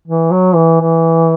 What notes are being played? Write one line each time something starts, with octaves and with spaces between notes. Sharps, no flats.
E3
F#3
E3
E3